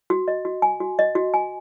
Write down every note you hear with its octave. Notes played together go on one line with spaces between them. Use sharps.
F#4
D#5
F#4
G#5
F#4
D#5
F#4
G#5